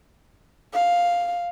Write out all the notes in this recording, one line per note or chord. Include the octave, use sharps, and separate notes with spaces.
F5